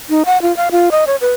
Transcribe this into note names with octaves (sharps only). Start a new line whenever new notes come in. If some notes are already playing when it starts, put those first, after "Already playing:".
D#4
F#5
F4
F5
F4
D#5
C#5
B4